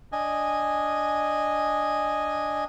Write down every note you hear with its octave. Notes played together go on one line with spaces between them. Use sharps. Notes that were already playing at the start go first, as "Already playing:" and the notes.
D4 D#5 G#5